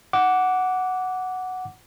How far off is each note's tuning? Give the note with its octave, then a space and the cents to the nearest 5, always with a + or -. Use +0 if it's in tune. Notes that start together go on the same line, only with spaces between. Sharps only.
F#5 +0 D6 -15